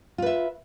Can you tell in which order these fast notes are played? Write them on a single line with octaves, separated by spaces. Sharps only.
F4 B4 E5